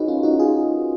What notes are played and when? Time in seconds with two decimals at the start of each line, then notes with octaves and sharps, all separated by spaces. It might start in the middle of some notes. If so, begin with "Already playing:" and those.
Already playing: D#4 F#4 G#4 A#4 B4 C#5
0.08 C#4 F4
0.23 D#4 F#4
0.39 F4 G#4